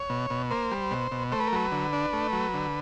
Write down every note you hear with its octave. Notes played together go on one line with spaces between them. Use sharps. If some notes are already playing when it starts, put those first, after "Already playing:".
Already playing: C#5
B2
B2
A#3 C5
G3
B2
B2
A3 C5
B4
A#4
F#3 B4
D3
D4
A3
F#3
D3